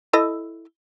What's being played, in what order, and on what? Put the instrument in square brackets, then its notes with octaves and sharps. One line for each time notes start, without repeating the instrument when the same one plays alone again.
[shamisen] E4 A4 D#5